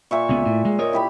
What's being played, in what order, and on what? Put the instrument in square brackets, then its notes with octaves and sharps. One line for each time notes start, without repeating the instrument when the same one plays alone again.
[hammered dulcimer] A#2 E5 C#6
[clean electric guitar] C#2 B3
A2
G#3
A#4 C#5 D#5
[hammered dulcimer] E4 G4 B5